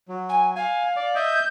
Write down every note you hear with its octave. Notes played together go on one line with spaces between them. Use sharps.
F#3
G#5
F5 G#5
D5
D#5 E5 G6